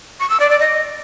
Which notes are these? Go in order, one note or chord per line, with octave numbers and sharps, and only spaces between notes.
C#6
E6
D5
D5
D#5